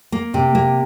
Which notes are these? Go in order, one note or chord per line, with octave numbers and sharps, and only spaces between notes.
A#3
C3
A#3